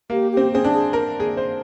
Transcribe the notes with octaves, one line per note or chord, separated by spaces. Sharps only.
A#3 G4
G4
C4
C4 G#4
D4
G#4
A#4
G#4
C5